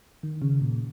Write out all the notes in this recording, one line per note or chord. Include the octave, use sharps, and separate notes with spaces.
D#3
C#3
A#2